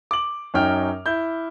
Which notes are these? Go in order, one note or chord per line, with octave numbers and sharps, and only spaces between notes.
D6 F#7
F#2 C#4 D#4 G5 F6
E4 G6